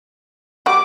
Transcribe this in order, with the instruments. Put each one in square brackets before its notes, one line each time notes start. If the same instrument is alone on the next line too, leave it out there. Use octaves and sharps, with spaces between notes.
[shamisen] G3 F#4 [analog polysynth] D6